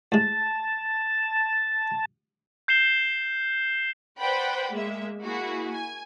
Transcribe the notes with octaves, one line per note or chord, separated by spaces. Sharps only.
A2 G#3 A5
G6 C7 E7 G7
B4 C5 D5 F#5 G5 B5
G#3 A#3 E5
A#3 E4 F#4 G#4
G#5